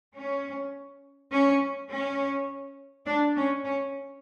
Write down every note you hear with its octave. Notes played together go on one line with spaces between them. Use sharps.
C#4
C#4
C#4
D4
C#4
C#4